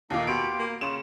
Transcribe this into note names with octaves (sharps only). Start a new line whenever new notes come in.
D#2 A#2 A3 D#4 F5
B2 B3 F4 G4 D7
A#3
C#3 F4 E7